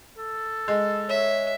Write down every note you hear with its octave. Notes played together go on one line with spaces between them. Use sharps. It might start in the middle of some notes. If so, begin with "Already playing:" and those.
A4
G#3
C#5 E5